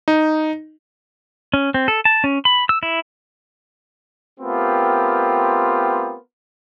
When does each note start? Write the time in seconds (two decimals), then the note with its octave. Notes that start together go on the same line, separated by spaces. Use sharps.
0.08 D#4
1.54 C#4
1.74 C4
1.88 A4
2.05 A5
2.24 C#4
2.45 B5
2.69 E6
2.83 E4
4.40 A3 B3 C4 F4 G4 A#4